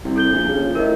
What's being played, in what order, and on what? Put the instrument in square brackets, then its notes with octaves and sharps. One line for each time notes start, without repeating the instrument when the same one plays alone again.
[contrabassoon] C2
[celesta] A4 G6 G7
[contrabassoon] A#1
C#3
F3
[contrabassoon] A2 [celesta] A#4 D#5